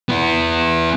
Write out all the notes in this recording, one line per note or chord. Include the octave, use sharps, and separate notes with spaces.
B3 E4